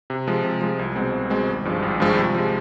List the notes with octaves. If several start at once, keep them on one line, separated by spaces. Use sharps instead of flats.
C3
F3 G#3
C3
F3 G#3
C2
B2 G#3 C4
C2
B2 G#3 C4
G#1
G2 F3 G#3
G#1
G2 F3 G#3
C3
F3 G#3